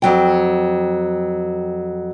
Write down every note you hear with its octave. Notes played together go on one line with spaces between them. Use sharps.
F2 F#3 G5